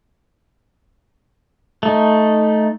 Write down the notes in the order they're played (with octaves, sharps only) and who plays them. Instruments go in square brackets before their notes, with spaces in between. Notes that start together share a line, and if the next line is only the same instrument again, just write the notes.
[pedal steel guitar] A3 D#4